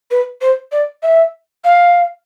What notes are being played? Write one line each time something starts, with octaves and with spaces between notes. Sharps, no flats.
B4
C5
D5
E5
F5